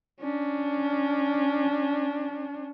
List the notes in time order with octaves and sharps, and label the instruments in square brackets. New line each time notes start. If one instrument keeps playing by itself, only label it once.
[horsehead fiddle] C#4 D4